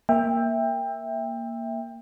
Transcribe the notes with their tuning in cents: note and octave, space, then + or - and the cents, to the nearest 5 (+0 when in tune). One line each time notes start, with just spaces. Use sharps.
A#3 +0 E5 +0 G5 +20